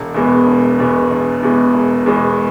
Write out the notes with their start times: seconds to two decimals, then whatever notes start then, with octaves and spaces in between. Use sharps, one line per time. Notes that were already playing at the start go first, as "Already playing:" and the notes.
Already playing: E1
0.14 E2 B2 G#3 B3
0.46 E1
0.79 E2 B2 G#3 B3
1.11 E1
1.43 E2 B2 G#3 B3
1.74 E1
2.06 E2 B2 G#3 B3